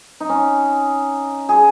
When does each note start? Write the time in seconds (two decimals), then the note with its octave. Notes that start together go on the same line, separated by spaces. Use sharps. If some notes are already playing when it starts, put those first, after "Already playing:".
0.20 D#4
0.29 C#4
1.49 G#4